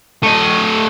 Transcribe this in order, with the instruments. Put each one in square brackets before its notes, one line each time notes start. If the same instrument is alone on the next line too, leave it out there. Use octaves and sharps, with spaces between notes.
[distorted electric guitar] A3 D#5